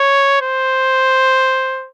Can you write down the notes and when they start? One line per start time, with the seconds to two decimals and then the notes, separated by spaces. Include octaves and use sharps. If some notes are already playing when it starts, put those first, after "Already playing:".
Already playing: C#5
0.41 C5